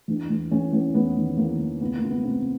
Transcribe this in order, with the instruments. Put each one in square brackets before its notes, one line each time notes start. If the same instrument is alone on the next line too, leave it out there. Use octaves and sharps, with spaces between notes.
[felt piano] E2 D4
E2
E2 C#4
E2
E2 B3
D#3
E2 A#3
E2
C#2 B3
A#3
C#2
B3
C3 C4